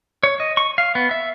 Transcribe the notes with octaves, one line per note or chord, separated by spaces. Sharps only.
C#5
D#5
C#6
F5
B3
E5